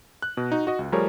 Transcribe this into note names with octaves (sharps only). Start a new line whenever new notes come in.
F#6
B2
D#4 F#4
F#4 D#5
C#2
F3 G3 A3 G#4 A#4 C#5